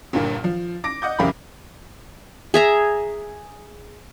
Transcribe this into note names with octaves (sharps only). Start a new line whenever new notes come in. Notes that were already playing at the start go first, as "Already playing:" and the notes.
G1 G2 A#2 A#4
F3
D6 A#6 D7
D#5 F#5 D6 G6
C2 F2 C#3 A#4 F5 B5
G#4 E5 A#5